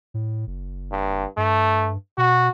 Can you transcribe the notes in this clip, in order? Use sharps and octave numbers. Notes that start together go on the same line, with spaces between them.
A2
F#1
G2
G2 A3
B2 F#4